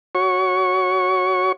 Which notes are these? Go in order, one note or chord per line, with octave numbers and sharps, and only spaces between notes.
F#4 C#5 C#6